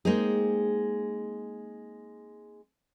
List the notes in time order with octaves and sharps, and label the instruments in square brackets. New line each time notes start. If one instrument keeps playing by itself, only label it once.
[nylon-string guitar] G#3 A#3 C4 D#4 G#4